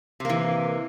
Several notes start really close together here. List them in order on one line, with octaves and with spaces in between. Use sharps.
C3 A#3 E3